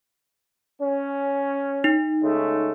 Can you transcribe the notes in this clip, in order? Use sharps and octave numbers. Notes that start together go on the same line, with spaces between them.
C#4
D#4
C#3 G#3 A3